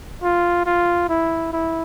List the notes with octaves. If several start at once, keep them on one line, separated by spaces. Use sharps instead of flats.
F4
F4
E4
E4